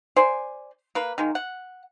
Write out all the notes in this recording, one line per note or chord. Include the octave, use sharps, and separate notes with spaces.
C5 D5 G#5
A#3 B4
D#3 G#3 A#3
F#5